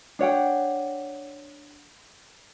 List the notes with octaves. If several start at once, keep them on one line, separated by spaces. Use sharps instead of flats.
D4 C#5 F#5 G5